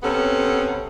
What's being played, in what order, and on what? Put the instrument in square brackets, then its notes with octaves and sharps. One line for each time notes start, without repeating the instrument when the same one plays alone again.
[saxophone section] C3 B3 C#4 A4